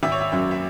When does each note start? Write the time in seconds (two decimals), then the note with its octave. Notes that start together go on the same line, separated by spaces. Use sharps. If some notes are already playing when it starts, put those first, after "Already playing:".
0.03 G#1 E5
0.12 C#5
0.21 E5
0.32 F#2 F#3 E5
0.51 E5